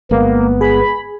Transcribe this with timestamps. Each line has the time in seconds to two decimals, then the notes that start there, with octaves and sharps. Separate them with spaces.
0.11 G1 G#3 A#3 B3
0.61 G#4 B5